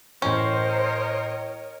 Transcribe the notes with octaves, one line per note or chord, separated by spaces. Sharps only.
A2 E3 C#4 A#4 C5 C#5 D#5